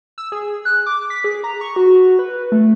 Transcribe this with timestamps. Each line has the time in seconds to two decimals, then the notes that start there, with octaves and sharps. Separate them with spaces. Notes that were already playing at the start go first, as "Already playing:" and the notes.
0.18 E6
0.32 G#4
0.65 F#6
0.86 D6
1.10 B6
1.24 G#4
1.44 A#5
1.61 C#6
1.76 F#4
2.19 B4
2.52 A3